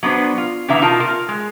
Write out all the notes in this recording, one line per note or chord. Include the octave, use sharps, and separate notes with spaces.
F#3 B3 D4 B4 C5
F4
C#3 E3 B3 D4 E5 A#5
B2 D#4 F4 A#4 A5
F4 A#4
G#3